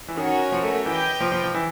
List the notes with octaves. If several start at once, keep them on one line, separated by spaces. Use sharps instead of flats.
E3
D#3 C#4 F#4 A#4 C#5
F3
A3
A3
E3 G4 B4 D#5 G5
F3
F3
F3
E3